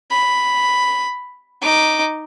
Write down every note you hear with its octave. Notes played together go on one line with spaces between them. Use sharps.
B5
D#4 D6